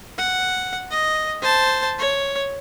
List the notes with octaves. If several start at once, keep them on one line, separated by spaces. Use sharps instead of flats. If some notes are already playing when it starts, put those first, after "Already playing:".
F#5
D#5
C5 A5
C#5